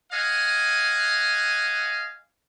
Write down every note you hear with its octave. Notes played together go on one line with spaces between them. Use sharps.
D#5 F5 F#5 G#5